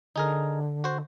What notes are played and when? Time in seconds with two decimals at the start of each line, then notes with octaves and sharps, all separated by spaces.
0.16 D3 D#4 G#4 A#4
0.84 F#4 C5